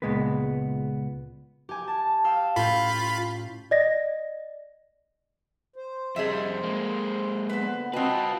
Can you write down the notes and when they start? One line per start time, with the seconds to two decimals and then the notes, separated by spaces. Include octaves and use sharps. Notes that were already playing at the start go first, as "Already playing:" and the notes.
0.02 C#2 F#2 A#2 G#3 B3 B4
1.69 G4 G#5
1.88 A5
2.24 F5 G5 E6
2.56 A2 C#4 F4 B5 G6
3.71 D5 D#5 A#6
5.76 C5
6.16 F2 G3 G#4 D#5 E5
6.63 G#3 A#3
7.49 D3 B3 B4 C5
7.93 C4 F4 F#4 B4 D#5 G5 A5